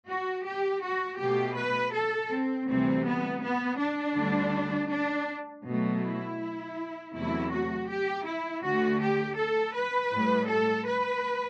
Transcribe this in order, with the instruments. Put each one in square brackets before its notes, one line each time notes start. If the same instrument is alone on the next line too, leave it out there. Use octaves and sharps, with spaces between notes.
[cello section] F#4
G4
F#4
B2 A3 G4
B4
A4
C4
D2 C3 E3 G3 C4
B3
B3
D4
D2 D3 G3
D4
B2 F#3 A3
E4
E2 C3 F#3 A3 E4
F#4
G4
E4
D2 D3 A3 F#4
G4
A4
B4
A2 G3
A4
B4